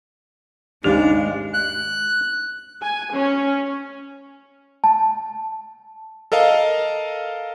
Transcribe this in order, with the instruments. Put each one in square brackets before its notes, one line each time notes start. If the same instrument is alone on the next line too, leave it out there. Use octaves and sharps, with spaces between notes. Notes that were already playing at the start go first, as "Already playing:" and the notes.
[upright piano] G#1 D#2 C#3 [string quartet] G#3 [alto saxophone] D4 [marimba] G4
[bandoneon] F#6
[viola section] G#5
C#4
[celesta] A5
[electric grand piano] A4 A#4 D#5 F5